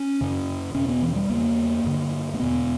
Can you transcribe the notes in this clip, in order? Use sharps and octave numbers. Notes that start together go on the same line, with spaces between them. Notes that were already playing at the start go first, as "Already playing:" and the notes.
Already playing: C#4
F#2 C#3
E2 B2 C#4
B3
E3
G3
E2 C#3 A#3
G2 D3
A#3
E2 B2 B3